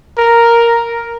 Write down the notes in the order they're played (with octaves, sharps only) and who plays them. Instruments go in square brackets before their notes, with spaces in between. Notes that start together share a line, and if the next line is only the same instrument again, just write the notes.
[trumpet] A#4